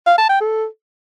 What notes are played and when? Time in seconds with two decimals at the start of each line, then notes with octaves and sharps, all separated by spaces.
0.06 F5
0.18 A5
0.29 G5
0.41 A4